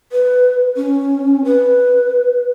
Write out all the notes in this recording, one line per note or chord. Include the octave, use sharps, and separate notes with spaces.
B4
C#4
B4